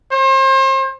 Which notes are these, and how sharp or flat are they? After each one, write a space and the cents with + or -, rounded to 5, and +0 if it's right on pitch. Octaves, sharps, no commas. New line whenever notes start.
C5 +35